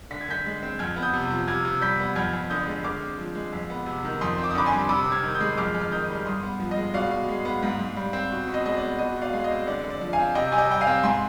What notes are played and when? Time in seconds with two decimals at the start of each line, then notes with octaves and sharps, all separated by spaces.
0.11 D3 B6
0.21 G#6
0.29 D3 G6 B6
0.46 G#3
0.63 C4
0.79 F2 F6 G#6
0.96 B3
1.02 D#6 G6
1.14 C3
1.31 F3
1.48 C3 F6 G#6
1.65 C3
1.81 G3 G6 B6
1.99 B3
2.16 F2 F6 G#6
2.33 F2
2.50 D3 D#6 G6
2.67 G#3
2.84 D3 D6 F6
3.01 C4
3.18 F3
3.35 G#3
3.53 F2
3.70 B3
3.86 C3
4.05 D#3
4.21 F2 C6 D#6
4.38 C4
4.44 D6
4.51 D#6
4.55 D3 B5 D6
4.66 G#5 C6
4.72 G3
4.89 C3 B5 D6
5.06 C4
5.12 F6 G#6
5.23 D#3
5.34 D#6 G6
5.40 G#3
5.57 F2 D6 F6
5.75 F2
5.81 F6
5.91 D#3 D#6 G6
6.09 G3
6.15 F6
6.26 G2 C6 D#6
6.43 B3
6.60 F3
6.71 D#5
6.77 G#3
6.94 B2 D5 F5
7.11 B2
7.29 G#3
7.45 B3
7.63 G#2
7.79 G#2
7.96 G3
8.13 C4
8.31 B2
8.48 B2
8.54 D#5
8.65 G#3 D#5
8.77 D5
8.82 B3
8.99 B2 D#5
9.16 B2
9.22 D5 F5
9.33 G#3 F5
9.44 D#5
9.50 C4
9.67 D3 D5
9.84 D3
9.90 D5
10.01 F3
10.13 F5 G#5
10.19 C4
10.35 C3 D#5 G5
10.52 C3 G#5
10.58 D#5 G5
10.70 G3 G5
10.81 F5 G#5
10.87 C4
11.03 G#2 G#5 C6